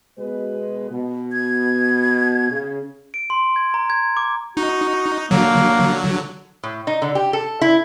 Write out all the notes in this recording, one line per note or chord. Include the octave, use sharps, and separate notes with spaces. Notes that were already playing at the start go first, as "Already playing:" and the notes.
B2 G#3 B4
B2
G#6
C#3
D7
C6
G#6
A#5
G#6
D6
D#4 F#4
D3 F#3 A#3
A2
D#4
D3
G4
A4
E4